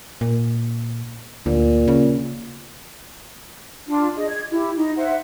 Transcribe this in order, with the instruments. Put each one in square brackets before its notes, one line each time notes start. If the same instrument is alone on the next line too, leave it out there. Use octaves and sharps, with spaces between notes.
[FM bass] A#2
[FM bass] D2 [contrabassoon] A#2
[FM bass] C#3
[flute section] D4 F4
G#4 D#5
G#6
E4 G4
D#4
C5 E5 F#5